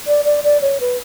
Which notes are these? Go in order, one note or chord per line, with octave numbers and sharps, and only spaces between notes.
D5
D5
D5
C#5
B4